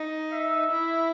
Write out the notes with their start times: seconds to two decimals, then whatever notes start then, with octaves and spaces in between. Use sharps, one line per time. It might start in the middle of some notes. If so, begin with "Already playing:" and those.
Already playing: D#4
0.33 E5
0.71 E4